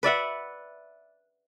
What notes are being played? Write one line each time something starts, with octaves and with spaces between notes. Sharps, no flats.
B4 D5 E5 F#5